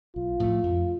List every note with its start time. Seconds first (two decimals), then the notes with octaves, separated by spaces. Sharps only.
0.16 B1 F4
0.40 A2 F3 A3
0.63 F2